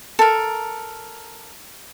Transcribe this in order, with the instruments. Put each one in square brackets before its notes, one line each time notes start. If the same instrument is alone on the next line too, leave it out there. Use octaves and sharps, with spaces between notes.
[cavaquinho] A4 A#4